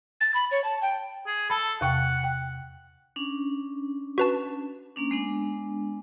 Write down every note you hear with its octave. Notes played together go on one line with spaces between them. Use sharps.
A6
B5
C#5
A5
G5
G#4
A4 A5 B5
E2 C3 F#5 G5
G5
C#4 D4
F#4 B4 A5
A#3 C#4 D4
G#3 B3 D4